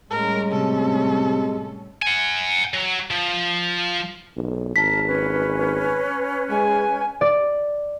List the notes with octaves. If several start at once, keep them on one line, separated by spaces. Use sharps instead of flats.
A2 G3 G#3 C#4 A#4
C3 A4
F#5 G#5
F#3
F3
B1
G#1 A#4 A5 B6
C#4 B4
G#3 G#5
D5